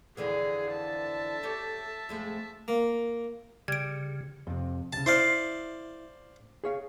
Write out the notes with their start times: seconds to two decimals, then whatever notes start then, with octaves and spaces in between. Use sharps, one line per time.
0.17 F2 D3 E3 G#4
0.72 E5 A5
1.43 G4 A4 C#5
2.09 F2 G#3 A3
2.68 A#3
3.68 C#3 G3 G#6 D7
4.47 F2 C3
4.93 C2 C#3 A5
5.06 E4 C5 D5 F5
6.64 G#4 C#5 F5